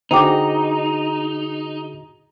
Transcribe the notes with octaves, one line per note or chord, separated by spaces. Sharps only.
D3 D#4 F#4 G#4 C5 G5 D6